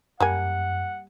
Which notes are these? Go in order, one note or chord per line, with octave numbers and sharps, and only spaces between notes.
F#2 G3 A#3 F#5 G#5